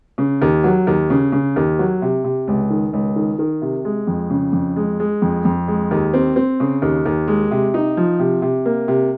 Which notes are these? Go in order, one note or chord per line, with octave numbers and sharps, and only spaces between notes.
C#3
D#2
F#3
D#2
C#3
C#3
D#2
F#3
C3
C3
C#2
D#3
C#2
D#3
D#3
C3
G#3
F2
C#3
F2
G#3
G#3
F2
F2
G#3
D#2
C4
C4
C#3
D#2
D#2
G#3
C3
D#4
F3
C3
C3
A#3
C3